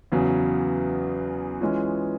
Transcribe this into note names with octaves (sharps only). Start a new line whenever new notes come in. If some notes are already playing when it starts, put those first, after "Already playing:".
E2 C#3 F#3
E3 G#3 C#4 F4